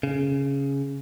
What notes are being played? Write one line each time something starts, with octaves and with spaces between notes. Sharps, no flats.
C#3